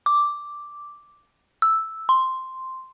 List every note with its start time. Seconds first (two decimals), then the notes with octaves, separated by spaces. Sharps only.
0.06 D6
1.62 E6
2.09 C6